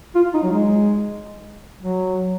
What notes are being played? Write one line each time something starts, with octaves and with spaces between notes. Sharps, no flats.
F4
D#4
F#3
G#3
F#3